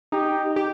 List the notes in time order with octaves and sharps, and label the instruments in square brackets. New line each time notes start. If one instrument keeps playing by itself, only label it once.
[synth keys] D#4 [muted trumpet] G4
[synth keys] G4